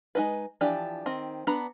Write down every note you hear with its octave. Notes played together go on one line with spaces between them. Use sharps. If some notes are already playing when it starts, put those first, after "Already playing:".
G#3 D#4 B4
E3 F3 D4 G4
D#3 C4
B3 D4 A#5 B5